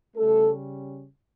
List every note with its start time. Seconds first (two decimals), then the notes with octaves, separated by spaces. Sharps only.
0.16 C#3 G3 A3 C#4 A4